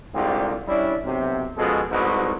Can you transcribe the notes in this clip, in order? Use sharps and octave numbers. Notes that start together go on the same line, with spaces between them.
C2 G#2 D3 F4 G4
G3 C#4 D4 E4
B1 C3
B2 F3 G#3 C#4 A4
C2 G#2 B2 F#4 B4